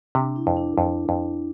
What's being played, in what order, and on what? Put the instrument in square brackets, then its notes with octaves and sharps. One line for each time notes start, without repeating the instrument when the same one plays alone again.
[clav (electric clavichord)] C3 [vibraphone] D4
[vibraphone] E4
[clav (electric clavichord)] F2
[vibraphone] D4
[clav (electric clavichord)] F2
F2